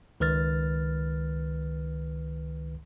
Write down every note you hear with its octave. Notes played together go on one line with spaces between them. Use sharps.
C#2 D#3 B4 F6 A6